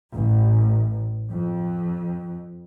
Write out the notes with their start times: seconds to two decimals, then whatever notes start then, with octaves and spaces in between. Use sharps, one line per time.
0.13 A1
1.29 F2